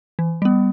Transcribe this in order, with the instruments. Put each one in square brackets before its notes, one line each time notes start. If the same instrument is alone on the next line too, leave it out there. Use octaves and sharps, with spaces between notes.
[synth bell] E3
G3 B3